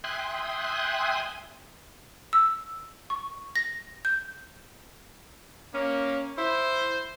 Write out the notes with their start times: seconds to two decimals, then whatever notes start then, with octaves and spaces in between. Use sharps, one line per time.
0.04 E5 G5 G#5 C6 D#6 F#6
2.33 E6
3.10 C#6
3.56 A#6
4.05 G6
5.74 A#3 C#4
6.38 E4 C5